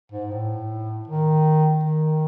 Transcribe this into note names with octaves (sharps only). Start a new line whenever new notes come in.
G#2
A2
D#3
D#3